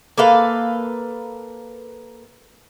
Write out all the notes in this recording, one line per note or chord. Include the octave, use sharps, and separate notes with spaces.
A#3 A4 B4 F5